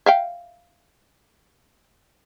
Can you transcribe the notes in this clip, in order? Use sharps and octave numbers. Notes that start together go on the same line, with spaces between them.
E5 F5 G5